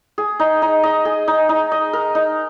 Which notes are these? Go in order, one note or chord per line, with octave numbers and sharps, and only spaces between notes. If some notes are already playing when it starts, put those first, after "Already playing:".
G#4
D#4
D#4
D#5
G#4
D#4
D#4
D#5
A#4
D#4